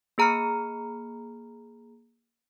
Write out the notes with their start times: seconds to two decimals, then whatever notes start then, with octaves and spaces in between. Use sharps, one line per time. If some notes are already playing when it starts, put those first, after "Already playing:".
0.18 A#3 G#4 A#5 B5 F6 C#7